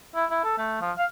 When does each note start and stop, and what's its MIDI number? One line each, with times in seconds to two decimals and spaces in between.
0.15 0.25 64
0.30 0.39 64
0.44 0.55 69
0.58 0.79 57
0.81 0.92 53
0.98 1.05 77